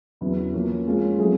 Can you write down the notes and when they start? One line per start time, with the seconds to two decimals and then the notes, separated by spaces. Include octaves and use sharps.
0.21 E2 C#3 F#3 B3 E4
0.54 F3 A#3 C#4 F4
0.86 F3 G#3 C#4 F4
1.18 F#3 A3 C4 E4 G#4